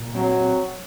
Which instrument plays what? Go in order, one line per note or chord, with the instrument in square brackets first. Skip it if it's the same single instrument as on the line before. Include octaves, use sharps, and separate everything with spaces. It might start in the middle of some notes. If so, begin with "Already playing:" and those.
Already playing: [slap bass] A#2
[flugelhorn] F#3 [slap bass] C4
[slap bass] C4